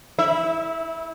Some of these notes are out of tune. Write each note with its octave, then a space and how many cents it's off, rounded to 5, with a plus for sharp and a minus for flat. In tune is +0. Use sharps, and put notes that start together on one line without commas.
E4 -25 E5 +0